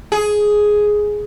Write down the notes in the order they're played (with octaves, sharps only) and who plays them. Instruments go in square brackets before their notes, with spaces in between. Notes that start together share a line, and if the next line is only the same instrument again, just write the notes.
[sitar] G#4